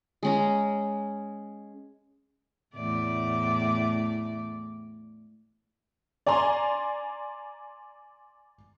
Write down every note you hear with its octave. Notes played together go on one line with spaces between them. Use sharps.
G#3 C#4 A#5
E2 A2 D5
D5 G#5 A#5 C6